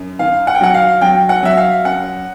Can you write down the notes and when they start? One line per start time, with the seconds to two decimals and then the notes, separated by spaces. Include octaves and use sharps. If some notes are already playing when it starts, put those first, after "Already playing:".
Already playing: F#2
0.19 D#3 F5
0.47 F#5
0.55 G5
0.61 F#3 F#5
0.74 F5
1.01 F#3 G5
1.29 F#5
1.43 F#3 E5
1.57 F5
1.84 F#2 F#5